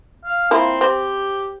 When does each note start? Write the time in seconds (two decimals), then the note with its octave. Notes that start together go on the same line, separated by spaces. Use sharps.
0.24 F5
0.51 A#3 C4 E4 F4
0.81 C4 G4